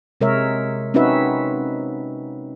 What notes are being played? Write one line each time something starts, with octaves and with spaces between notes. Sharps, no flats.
C3 G#3 A#4 C#5 E5
C4 C#4 D#4 F#4 B4 E5